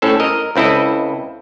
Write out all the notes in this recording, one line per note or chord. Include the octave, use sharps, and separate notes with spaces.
A2 C#4 A4 C5
A#4 D#5
C#2 C4 E4 A4 D#5